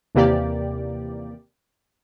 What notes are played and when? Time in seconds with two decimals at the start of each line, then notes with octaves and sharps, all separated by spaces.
0.15 D#2 C3 E3 A#3 G4 D5